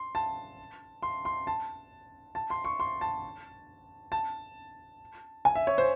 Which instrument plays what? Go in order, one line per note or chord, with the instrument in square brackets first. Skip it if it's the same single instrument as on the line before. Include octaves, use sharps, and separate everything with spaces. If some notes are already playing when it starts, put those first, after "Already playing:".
Already playing: [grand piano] C6
A5
C6
C6
A5
A5
C6
C#6
C6
A5
A5
G#5
E5
C#5
C5